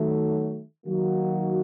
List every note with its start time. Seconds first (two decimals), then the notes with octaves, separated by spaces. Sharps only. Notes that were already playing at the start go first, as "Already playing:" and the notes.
Already playing: D#3 F#3 A3
0.86 D#3 F#3 A#3 D#4 F#4